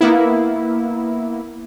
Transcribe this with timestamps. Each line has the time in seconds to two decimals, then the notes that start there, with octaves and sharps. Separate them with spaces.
0.01 A#3 B3 E4